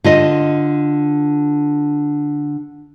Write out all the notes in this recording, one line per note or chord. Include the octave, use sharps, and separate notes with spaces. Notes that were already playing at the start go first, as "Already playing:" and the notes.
D3 F4 D#5